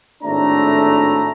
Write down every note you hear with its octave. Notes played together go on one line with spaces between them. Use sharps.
G#1 A2 A3 D4 A#5